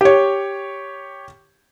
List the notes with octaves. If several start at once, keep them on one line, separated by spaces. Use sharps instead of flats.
G4 C#5